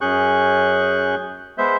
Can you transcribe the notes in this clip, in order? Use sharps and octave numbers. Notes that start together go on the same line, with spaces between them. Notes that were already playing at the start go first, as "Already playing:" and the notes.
F#2 C#4 G#4 C#6 F#6 G6
G#3 B3 C5 E5 G6